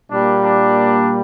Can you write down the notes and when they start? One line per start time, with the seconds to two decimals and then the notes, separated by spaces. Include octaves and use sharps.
0.11 A#2 G3 A#3 D4
0.44 D4